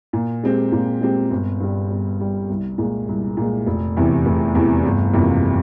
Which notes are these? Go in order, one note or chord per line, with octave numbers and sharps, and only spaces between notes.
A#2
G#3 C4 G4
A#2
G#3 C4 G4
G1
G2 G3
G1
G2 G3
C2
A#2 G#3
C2
A#2 G#3
F1
E2 C3 E3
F1
E2 C3 E3
G1
F2 C3 E3 A#3